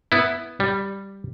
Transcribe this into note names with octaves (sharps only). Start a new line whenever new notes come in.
B3 E4
G3